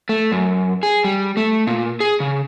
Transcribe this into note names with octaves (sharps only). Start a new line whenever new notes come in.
A3
F#2
G#4
G3
A3
A#2
G#4
C#3